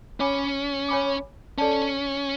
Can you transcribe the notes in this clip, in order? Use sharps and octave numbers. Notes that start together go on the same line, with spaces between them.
C#4 C#5 G#5 B5 D6
C#5 G#5 B5 D6
C#4 A4 D5 A5